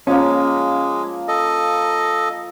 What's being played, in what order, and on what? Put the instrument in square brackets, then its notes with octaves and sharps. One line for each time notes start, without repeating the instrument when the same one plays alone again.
[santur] F3 A#3 [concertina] G#3 [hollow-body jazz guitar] C#4
[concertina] A4 D#5